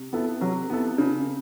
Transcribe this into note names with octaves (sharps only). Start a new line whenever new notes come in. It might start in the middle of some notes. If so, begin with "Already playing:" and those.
Already playing: C3
B3 E4 A4
C3 F#3
B3 E4 A4
C#3